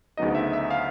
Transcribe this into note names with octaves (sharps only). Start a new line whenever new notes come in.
D2 C#3 F#3 B3 D#4 D#5
E5
E5
F5